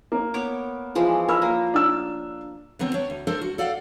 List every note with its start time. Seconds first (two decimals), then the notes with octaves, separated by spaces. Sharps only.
0.12 A#3
0.34 B3 C#5 D6
0.95 E3 F3 G#3
1.28 A#4 C#5 B5 E6
1.42 A#3
1.74 D4 E6
2.79 D3 F#3 B3 C4
2.94 D4 C#5
3.10 D2
3.27 D4 A4 A#4 C5
3.41 F#4
3.58 A4 D5 F5 F#5